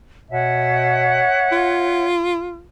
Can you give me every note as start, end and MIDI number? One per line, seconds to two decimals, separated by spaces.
0.30 1.23 47
0.30 2.05 73
0.30 2.05 76
0.30 2.05 78
1.52 2.63 65